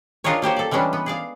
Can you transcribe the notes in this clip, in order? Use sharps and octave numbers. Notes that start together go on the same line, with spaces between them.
D4 D#4 F4 G#4 A#4 C#5
A#3 G4 C5 C#5
A4 D5
E3 G3 G#3 C#4 D4
B3
G#4 D5 F5